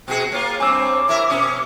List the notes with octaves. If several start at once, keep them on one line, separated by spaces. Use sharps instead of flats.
B2 F#4 G#4 G5
A#3 F4 C#5
G2 C4 C#5 G#5 D6 E6
E4 A#4 E5
B2 C#4 D#6